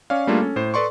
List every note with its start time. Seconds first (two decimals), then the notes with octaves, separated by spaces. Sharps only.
0.10 C#4 C#5 D5 F5
0.27 G3 A3 A#3 D4 F4 G#4
0.40 C#4 A4
0.56 A2 C5
0.74 A4 B4 D5 C6 C#6